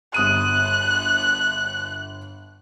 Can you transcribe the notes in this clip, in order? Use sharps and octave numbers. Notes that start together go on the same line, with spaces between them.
G1 D#6 F#6 D#7